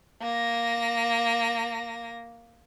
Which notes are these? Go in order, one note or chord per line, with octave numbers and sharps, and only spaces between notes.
A#3 A#6